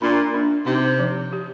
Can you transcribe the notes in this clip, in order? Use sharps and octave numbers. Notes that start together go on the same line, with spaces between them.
A#2 D4
D4
C3 D#4
F3
G4